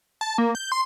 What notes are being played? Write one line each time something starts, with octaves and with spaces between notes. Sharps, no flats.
A5
A#3
G6
C6